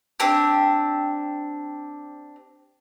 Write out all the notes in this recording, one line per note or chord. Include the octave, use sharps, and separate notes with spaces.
C4 D4 G4